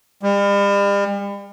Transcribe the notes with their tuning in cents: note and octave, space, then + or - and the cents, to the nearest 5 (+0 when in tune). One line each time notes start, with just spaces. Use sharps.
G3 +40